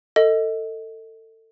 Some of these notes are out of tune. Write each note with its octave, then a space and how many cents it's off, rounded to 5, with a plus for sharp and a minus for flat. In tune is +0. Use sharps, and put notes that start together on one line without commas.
A4 +30 D#5 +20